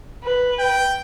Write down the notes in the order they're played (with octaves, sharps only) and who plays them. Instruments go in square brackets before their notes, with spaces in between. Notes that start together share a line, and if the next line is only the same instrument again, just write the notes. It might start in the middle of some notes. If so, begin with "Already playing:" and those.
[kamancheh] B4
[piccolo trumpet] G5